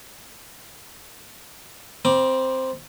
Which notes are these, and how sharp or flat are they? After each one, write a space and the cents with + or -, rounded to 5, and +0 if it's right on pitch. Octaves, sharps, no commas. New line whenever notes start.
C4 +0 B5 -40 D6 +0